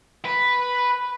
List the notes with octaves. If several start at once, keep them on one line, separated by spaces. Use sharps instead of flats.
B4